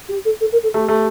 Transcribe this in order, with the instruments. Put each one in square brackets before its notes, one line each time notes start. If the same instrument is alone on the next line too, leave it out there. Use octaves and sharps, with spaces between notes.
[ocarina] G4
A4
A4
A#4
A4
[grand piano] A3 [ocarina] G4
[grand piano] A3